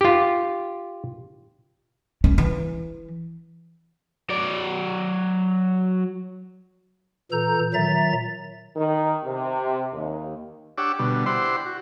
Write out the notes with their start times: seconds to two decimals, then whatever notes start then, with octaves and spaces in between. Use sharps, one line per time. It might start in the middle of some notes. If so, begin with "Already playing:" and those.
0.01 F4 G4
2.24 C#4
2.38 E3
4.30 F#3 D5
7.32 A#2 E3 A4 A#5 G6
7.74 A#2 D#3 F#3 E5 A#5 A6
8.76 D#3
9.24 C3
9.94 D#2
10.78 D4 G4 C#5 F#5 D6 E6
10.99 B2 D3 G3
11.26 E4 G4 C5 D5 F#5 C6
11.66 F#4